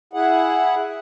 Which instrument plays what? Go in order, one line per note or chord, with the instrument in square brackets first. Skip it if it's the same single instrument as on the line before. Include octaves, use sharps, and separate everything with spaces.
[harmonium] E4 G#4 F#5